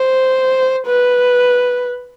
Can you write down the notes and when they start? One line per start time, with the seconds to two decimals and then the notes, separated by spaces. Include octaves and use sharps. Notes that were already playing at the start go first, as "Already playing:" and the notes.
Already playing: C5
0.87 B4